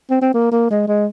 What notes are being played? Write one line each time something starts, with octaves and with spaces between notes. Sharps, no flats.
C4
C4
A#3
A#3
G#3
G#3